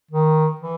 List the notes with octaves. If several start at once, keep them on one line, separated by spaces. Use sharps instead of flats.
D#3
E3